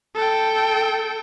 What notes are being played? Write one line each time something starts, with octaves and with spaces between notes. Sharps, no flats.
A4 G5